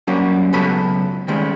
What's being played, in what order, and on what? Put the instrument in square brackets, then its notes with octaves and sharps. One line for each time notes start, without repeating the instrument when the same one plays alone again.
[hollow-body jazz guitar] F#3 G3 A#3 C#4
C#2 F#2 B2 F#3 A4 B5
D#3 G3 G#3 C#4